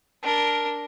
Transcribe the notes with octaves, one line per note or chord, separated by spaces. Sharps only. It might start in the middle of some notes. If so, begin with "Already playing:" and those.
D4 A#4